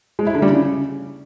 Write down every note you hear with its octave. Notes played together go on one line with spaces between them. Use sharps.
G#3
E4
D3
G3
C#3